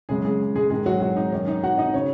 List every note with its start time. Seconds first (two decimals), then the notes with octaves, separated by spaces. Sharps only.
0.09 F#2 C#3 G#3 G#4
0.25 G#3 G#4
0.55 G#3 G#4
0.70 G#2 D#3 G#3 G#4
0.86 F#3 F#4
1.01 F#3 F#4
1.17 D#4
1.32 F#2 D#3 C#4
1.48 D#4
1.64 F#4 F#5
1.78 D#4 D#5
1.94 C#3 C#4 C#5